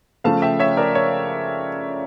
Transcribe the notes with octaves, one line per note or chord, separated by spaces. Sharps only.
C#3 F3 A3 F5 A5
E5 G5
C#5 E5
A#4 D5
C#5